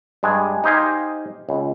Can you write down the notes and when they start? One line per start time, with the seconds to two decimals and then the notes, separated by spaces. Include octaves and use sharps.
0.23 G2 G#3 D4 G#5
0.64 D#4 G4 C5 F5 G#5
1.49 C#2